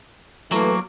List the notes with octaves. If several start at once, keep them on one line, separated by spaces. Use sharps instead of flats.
E3 F#3 A3 A#3